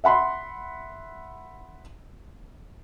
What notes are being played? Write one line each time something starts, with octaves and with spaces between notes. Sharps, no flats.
E5 F#5 B5 C6